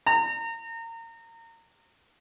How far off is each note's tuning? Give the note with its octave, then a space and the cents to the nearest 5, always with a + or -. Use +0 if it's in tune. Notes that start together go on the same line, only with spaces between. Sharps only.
A#5 -30